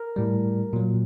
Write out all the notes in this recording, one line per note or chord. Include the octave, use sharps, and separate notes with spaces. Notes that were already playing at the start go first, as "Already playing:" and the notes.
Already playing: A#4
A2 G3
A#2 F#3